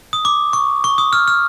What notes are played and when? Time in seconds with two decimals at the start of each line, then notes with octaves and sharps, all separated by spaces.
0.13 D#6
0.25 D6
0.53 C#6
0.84 C#6
0.98 D#6
1.13 F6
1.28 F6